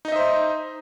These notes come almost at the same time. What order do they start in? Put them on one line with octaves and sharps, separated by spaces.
D#4 D#5 E5 C5